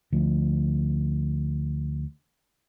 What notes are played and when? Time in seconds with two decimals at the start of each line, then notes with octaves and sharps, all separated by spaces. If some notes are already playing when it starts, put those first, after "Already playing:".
0.13 D2 F3